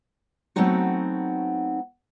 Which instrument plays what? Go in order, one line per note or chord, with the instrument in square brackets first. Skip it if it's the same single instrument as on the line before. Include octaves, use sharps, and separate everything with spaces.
[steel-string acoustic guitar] F#3 A3 B3 C4 D#4 F#4